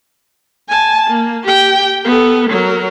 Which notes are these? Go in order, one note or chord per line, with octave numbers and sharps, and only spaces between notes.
G#5 A5
A#3
G4 G5
B3 A4
F#3 A#4